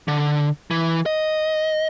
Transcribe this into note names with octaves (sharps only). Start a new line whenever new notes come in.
D3
E3
D#5